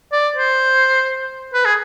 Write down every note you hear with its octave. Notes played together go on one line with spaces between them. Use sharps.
D5
C5
B4
G#4